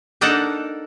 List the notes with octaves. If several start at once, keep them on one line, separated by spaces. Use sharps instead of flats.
A#3 D4 D#4 A4 A#4 F#5